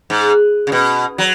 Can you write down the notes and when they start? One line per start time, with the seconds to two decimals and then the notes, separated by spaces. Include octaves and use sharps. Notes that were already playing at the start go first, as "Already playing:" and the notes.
0.10 G#2
0.67 C#3
0.72 B2
1.18 F#3